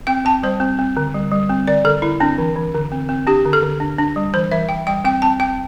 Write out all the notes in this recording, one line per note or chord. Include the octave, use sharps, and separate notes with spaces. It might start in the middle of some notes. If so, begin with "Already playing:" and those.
C4 G5
C4 A5
G3 C5
C4
C4
D3
G3
G3
C4
D3 D5
D3 A4
D3 E4
C4 D4
E3
E3
D3
C4
C4
D4 G4
D3
A4
D3
D4
D4
G3
E3 C5
E3 E5
E3 G5
G3 G5
C4 G5
C4 A5
C4 G5